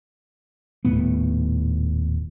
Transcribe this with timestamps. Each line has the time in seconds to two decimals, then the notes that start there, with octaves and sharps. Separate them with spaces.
0.85 D#1 D#2 A2 B3